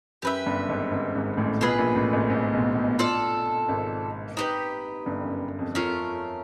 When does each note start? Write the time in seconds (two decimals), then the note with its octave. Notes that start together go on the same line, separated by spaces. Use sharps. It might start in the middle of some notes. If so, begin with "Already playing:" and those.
0.22 F#2 G4 B4 E5
0.46 G1 G2
0.69 G#1 G#2
0.91 G#1 G#2
1.15 G#1 G#2
1.37 A1 A2
1.60 B1 B2 F4 G#4 B4
1.78 A#1 A#2
1.95 A1 A2
2.13 G#1 G#2
2.30 G#1 G#2
2.53 B1 B2
2.75 B1 B2
2.99 F4 A4 D5
3.68 G#1 G#2
4.37 D#4 G4 B4
5.06 G1 G2
5.23 F#2
5.59 F2
5.75 F2 A3 C#4 F4 A#4